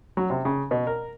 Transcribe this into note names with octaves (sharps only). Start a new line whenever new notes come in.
F#3
C3
C#3
B2
A#4